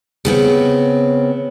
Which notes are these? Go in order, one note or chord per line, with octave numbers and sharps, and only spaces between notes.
C#3 B3 C4